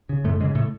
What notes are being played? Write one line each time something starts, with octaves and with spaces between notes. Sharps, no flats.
C#3
F#2 A2 A3
G#2 C#3 G#3
A2 A3